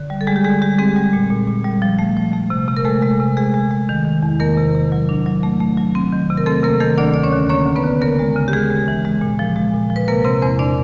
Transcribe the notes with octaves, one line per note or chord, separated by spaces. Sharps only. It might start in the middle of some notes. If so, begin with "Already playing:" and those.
Already playing: D3
G3
A4
G3 G#3 G#4
G4
D3 G#3 G#4
G3 G4
G#3 C4 G#4
G3
A#2
A#2
A#2
G3
F3
A3
F3
A3
C3
C3
A#4
G#3 A3 A4
G#3
C3
G#3 G#4
G#3
G#3
D#3
D#3
E2
D#3 A#3 A#4
C3
C3
F#3
D4
F#3
A3
A3
F#3
C4
D#3
C3
A#4
A3 C4 A4
C3 A#3 A#4
D#3 A3 A4
D2 D4 D5
D2 D5
C#4 C#5
D3
A#3 C#4 C#5
D2
B3 B4
D3
C#3 A#3 A#4
G#3
C#3
G4
G#3 G#4
G#3
E3
G#3
A#2
F3
G#3
A#2
F3
B4
C3 A#3 A#4
C3 C4 C5
E2 C4 C5
D4 D5